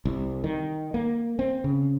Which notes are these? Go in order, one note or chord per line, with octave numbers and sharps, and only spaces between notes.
C2
D#3
A#3
C4
C#3